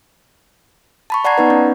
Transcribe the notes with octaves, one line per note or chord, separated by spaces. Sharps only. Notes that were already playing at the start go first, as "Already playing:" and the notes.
A5 B5 C#6
D5 F#5 A5 A#5 G#6 C7
B3 D#4 B4
C#4